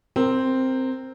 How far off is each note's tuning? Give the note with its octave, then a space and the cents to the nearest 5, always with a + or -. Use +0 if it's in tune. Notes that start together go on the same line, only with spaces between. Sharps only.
C4 +0 A#4 -15